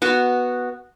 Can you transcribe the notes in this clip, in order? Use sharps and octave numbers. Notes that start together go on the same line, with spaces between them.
B3 F#4